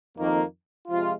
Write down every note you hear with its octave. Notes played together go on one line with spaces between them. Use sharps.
F2 D#3 A#3
C3 F3 G#3 F4